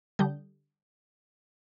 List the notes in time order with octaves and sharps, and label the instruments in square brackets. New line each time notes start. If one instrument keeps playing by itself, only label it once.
[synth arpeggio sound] D3 G3 D4 D#6 G6